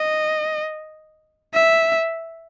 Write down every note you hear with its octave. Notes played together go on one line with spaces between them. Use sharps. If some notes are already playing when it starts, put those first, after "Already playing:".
Already playing: D#5
E5